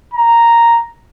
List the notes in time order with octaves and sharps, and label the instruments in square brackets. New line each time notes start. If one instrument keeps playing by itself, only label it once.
[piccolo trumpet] A#5